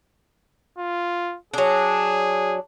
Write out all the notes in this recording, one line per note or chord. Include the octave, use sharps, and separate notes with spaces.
F4
F#3 D4 G#4